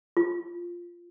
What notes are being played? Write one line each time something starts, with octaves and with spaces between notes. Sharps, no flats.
F4